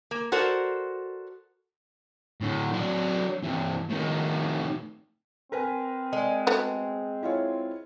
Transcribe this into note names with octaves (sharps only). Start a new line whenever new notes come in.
A#3
F#4 A4 A#4 C5 D5 F#5
A2 D3
F#3 D4
G2 E3
A2 D#3
C4 A#4 B4 G#5
G#3
A3 B3 F#4
E4 F4 C#5